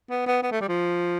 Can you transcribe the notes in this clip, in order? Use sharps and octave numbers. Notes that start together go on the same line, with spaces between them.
B3
B3
B3
A3
G3
F3